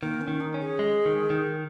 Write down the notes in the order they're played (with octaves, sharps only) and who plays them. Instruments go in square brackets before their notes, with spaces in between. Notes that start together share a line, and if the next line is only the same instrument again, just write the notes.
[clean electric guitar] D#3 [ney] A#3
[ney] C#4
[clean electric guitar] D#3
[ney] D#4
[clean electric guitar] C#4
[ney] G#4
[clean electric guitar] G#3
D#3
D#3